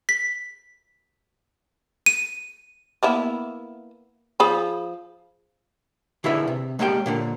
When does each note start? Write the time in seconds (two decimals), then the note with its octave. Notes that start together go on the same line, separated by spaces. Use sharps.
0.09 B6
2.06 D#7
3.03 A#3 B3 E4
4.40 F3 G#4 B5
6.24 D3 E4 G#4 B4 E5
6.48 C3
6.79 G#3 A#3 C#4 E4 G4 G5
7.06 A#2 D3 A#3